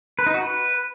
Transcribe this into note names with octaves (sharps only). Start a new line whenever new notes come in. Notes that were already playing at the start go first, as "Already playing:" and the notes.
B4
D#4
F#4
B4